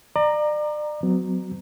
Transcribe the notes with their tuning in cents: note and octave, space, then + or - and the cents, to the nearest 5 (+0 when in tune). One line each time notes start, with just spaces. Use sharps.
D5 +35 A#5 +0
F#3 +0 B3 +45